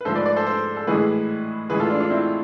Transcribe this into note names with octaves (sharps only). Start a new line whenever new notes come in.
B4
G#2 F3 A3 A4 C5
B4 D5
B4 D5
A4 C5
A4 C5
A4
A2 E3 G#3 G#4 B4
A2 E3 G#3 G#4 B4
F4 A4
D4 F4
D4 F4
C4 E4